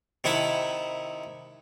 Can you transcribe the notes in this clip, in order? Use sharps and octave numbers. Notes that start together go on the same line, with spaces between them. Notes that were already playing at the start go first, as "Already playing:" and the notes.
C3 D#3 E4 F#5 A5 B5